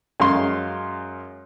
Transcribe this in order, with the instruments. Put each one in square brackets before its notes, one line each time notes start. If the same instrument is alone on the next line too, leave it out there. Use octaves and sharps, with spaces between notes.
[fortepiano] F#2 G#3 F5 C6